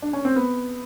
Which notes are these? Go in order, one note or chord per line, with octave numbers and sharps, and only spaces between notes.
D4
C#4
C4
B3